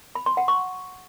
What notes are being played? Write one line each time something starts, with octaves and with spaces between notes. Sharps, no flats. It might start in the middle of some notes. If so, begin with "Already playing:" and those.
B5
C6
F#5
C#6